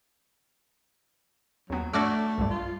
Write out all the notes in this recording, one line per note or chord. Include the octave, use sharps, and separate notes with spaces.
D#2 F#3 B3
A3 D4 F#4 D5 D6 E6 G#6
B1 G2 G3
F4